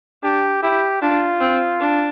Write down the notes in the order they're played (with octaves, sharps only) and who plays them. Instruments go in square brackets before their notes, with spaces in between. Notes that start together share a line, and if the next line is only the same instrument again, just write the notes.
[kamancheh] D4 [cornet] G4
[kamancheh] E4 [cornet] G4
[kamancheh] D4 [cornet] F4
[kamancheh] C4
D4